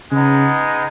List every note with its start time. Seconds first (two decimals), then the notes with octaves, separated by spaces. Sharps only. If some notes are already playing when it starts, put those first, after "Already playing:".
0.12 C#3 G#3 B3 D#4